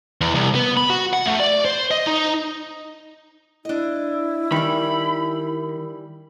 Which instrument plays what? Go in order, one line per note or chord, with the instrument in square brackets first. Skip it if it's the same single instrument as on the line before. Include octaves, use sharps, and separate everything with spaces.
[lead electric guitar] E2
C2
B3
B5
F#4
F#5
A3
D5
C5
D#5
D#4
[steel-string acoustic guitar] D4 D#5 [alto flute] E4
[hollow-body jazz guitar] D#3 [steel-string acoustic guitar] E3 G3 [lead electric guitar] B5